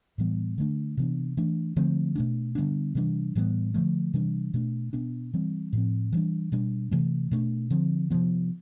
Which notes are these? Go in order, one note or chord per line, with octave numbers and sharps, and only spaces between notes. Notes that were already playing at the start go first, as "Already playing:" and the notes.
A2 E3 G3 B3
D3 A3 D4
C3 E3 B3 D4
E3 A3 D4
D3 F3 A3 C4
B2 A3 D4
D3 G3 B3 D4
C3 E3 G3 D4
A2 E3 G3 B3
D3 F3 A3
C3 E3 G3 D4
B2 A3 D4
B2 B3 D4
E3 G3 C4
A2 F3 C4
E3 G3 D4
B2 G3 D4
C3 E3 A3
B2 A3 D4
D3 F3 C4
C3 F3 B3